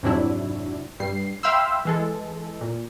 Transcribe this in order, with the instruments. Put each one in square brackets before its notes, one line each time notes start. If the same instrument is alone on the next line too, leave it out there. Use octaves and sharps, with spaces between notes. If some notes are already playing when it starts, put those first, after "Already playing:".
[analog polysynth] F2 G#2 C3 F#3 D4 E4
G2 G3 C7
E5 F5 G5 B5 C6 E6
E3 G#3 A4
A#2